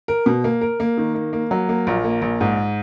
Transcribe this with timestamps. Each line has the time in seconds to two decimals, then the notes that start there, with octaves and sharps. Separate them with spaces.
0.08 A#4
0.26 B2
0.44 A#3
0.61 A#4
0.80 A#3
0.98 D#3
1.15 A#3
1.33 A#3
1.51 F#3
1.69 A#3
1.87 A#1
2.04 A#3
2.22 A#1
2.41 G#2